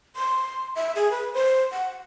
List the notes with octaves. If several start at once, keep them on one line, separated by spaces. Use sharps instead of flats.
C6
E5
G#4
B4
C5
F#5